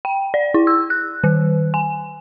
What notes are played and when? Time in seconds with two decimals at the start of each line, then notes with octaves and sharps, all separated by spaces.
0.05 G5
0.34 D5
0.54 E4
0.67 E6
0.90 F#6
1.24 D#3
1.74 G#5